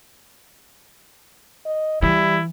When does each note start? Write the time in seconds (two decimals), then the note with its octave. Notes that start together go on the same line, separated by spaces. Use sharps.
1.65 D#5
2.02 E3 G3 E4